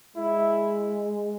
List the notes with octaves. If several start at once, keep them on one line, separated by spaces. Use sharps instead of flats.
G#3 E4